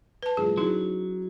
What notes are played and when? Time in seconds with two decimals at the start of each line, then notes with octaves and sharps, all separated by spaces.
0.22 B4 A5
0.37 A2 F3 G3 G#4
0.57 F#3 C#4 D#4 E4 G#4